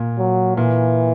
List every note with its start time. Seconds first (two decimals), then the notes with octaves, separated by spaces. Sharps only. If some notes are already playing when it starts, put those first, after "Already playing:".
Already playing: A#2
0.18 F#3
0.57 A#2 E3